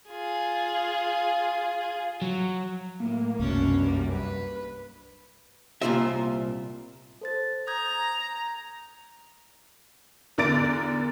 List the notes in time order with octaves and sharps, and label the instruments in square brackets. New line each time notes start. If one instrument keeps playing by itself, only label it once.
[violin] F4 G#4
[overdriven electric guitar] F#3
[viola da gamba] A2 [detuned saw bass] A#3
[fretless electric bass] C2 [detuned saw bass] F#2 [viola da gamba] B2 C#4 D4
[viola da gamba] G2 A#3
B4
[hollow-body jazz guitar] C2 A#2 C#4 F4 D#5 E5
[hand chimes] A4 C5 A6
[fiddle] A#5 [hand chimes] D#6 G6 G#6
[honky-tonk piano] E2 D3 A#4 D5 A6 D7